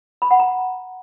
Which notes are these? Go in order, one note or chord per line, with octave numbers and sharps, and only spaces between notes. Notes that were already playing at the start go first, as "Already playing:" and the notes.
B5
F#5
A#5